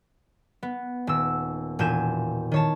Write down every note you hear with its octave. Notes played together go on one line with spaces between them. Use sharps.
B3
D#1 E6
E1 A#2 G#5 G6 E7
D#3 C#5 A5